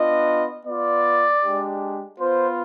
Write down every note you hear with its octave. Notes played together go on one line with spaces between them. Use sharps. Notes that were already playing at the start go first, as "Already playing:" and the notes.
Already playing: B3 D4 F4 D#5
B3 F4 D5
G#3 D4 G4
B3 F4 C5